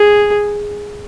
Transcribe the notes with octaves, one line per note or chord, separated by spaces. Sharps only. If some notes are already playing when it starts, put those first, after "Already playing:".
Already playing: G#4